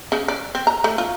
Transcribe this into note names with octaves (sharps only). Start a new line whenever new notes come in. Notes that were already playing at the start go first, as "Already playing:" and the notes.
C#3
D5
C4
A#5
A3
F4